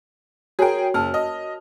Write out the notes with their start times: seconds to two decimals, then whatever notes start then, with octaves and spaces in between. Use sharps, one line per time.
0.59 F#4 G#4 A#4 C#5 G5
0.94 F#1 A#4 A5 F6
1.14 D#5